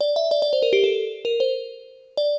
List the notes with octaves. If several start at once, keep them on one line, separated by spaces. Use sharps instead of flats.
D5
E5
D5
D5
C5
A#4
G4
A4
A#4
C5
D5